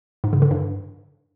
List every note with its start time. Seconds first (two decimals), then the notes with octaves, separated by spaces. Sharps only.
0.24 G#2
0.33 C#3
0.42 D3
0.51 G2